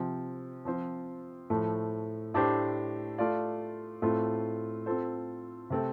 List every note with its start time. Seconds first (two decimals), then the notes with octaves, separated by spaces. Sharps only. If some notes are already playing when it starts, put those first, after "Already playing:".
Already playing: C3 F3 C4
0.65 F3 C4 F4 C5
1.50 A2 F3 A3
2.34 A2 A3 D4 G4 C5
3.18 A3 F4 D5 F5
4.02 A2 A3 C4 F4
4.86 C4 F4 A4 C5
5.70 C3 A3 C4 A4